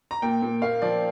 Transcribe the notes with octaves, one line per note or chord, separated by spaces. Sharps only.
A#5
A#2 G5
A#2
A#3 F5
F3 D5